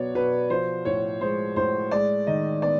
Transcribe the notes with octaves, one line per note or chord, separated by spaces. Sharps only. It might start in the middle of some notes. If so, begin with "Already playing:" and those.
Already playing: B2 F#3 B3 C#5 D5
B2 B4
F3 C5
A2 C#5
G#3 C5
A2 C5
G#3 D5
D#3 D#5
B3 D5